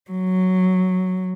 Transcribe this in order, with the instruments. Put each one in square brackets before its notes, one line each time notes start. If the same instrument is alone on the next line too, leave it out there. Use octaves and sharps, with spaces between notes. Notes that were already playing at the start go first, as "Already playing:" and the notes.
[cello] F#3